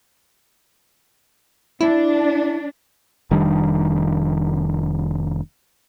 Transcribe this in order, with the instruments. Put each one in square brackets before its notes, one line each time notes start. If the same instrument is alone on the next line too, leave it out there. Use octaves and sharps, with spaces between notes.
[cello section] D4 [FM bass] E4
[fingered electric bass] F1 D#3 G3 D4